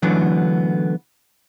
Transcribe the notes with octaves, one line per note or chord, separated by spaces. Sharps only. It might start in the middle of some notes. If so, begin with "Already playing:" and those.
D3 E3 F#3 A3 B3 D4